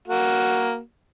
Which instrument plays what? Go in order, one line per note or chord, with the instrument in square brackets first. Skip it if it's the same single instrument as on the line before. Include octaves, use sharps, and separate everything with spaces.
[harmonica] A#3 F#4